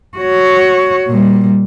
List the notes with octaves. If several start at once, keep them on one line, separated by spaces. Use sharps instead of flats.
F#4 C#5
A#2 G3